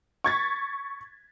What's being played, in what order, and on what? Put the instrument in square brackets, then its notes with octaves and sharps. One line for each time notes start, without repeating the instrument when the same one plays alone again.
[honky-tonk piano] C#6 G#6 A6 B6